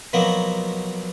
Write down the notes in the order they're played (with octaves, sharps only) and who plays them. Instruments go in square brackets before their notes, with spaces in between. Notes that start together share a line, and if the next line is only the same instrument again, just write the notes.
[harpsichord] B2 F3 F#3 A#3 B3